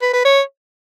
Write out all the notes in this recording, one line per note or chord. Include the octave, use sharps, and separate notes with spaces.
B4
B4
C#5